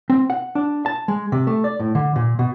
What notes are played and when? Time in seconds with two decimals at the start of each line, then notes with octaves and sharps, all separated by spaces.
0.10 C4
0.30 F#5
0.55 D4
0.86 A5
1.08 G#3
1.32 C3
1.47 A3
1.64 D5
1.80 A2
1.95 D3
2.16 A#2
2.39 B2